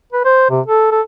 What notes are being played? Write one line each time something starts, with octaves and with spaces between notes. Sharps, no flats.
B4
C5
C3
A4
A4